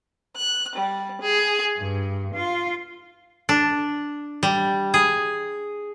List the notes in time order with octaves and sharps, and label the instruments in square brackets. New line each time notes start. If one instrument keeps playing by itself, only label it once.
[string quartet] F#6
G3
G#4
G2
F4
[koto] D4
G3
G#4